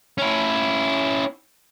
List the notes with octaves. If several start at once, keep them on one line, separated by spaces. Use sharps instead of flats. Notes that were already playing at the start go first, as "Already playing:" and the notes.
C#4 E4